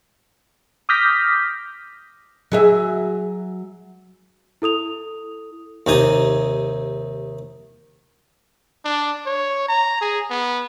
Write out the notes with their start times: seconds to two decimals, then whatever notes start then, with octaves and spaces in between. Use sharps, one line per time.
0.89 D6 D#6 F6 G6 A#6 B6
2.52 F#3 G#4 E5
4.62 E4 A4 D#6 F7
5.87 D#2 C3 D#4 G#5 D#6
8.85 D4
9.26 C#5
9.68 A#5
10.01 G#4
10.30 B3